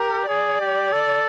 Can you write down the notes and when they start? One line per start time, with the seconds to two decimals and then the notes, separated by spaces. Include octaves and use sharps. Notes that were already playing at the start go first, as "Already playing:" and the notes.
Already playing: G4 A#4
0.27 G#4 D5
0.60 G4
0.92 A4